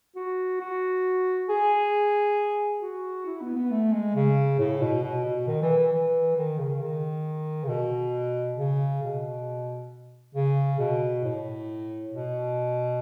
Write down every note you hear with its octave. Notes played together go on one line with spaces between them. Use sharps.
F#4
F#4
G#4
F#4
E4
B3
B3
A3
G#3
C#3
A2
B2
B2
B2
D#3
E3
E3
E3
D#3
C#3
D#3
C#3
B2
C#3
B2
C#3
B2
A2
B2